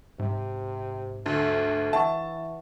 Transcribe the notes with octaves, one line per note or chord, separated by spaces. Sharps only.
G#2 C3
D2 A3
E3 E5 F#5 A5 C#6